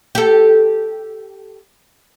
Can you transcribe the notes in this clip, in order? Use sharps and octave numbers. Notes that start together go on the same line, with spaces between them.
G4 A4